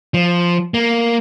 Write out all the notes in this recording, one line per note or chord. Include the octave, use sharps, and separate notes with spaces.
F3
A#3